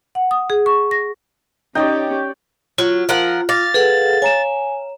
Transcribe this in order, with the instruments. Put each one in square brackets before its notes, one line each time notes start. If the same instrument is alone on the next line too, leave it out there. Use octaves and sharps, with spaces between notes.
[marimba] F#5
D#6
G#4
C#6
A#6
[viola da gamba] C#4 G4 [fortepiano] D#4 [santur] C#5 D5 G5
[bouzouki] F#3 [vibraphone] F4
[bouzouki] F3 A#4 F#5
[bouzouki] F5 [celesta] D6 A#6 [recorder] A6
[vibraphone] G#4 A4 F#5 [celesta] B4
[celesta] C#5 A#5 E7 [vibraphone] G#5